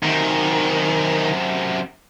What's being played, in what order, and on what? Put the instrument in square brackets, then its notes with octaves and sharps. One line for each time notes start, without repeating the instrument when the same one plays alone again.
[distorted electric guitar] F#2 C3 [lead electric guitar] D#3